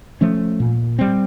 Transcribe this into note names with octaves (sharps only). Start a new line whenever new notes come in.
F3 A3 C#4
A#2
G3 C4